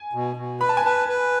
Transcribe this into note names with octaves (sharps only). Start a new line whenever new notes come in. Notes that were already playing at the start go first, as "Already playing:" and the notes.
Already playing: G#5
B2
B2
B4 B5
A5
G#5
B4 A5
B4